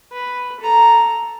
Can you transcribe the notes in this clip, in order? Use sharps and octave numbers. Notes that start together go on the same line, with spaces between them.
B4
A4 A#5